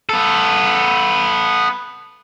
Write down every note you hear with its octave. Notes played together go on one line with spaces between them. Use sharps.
B3 A4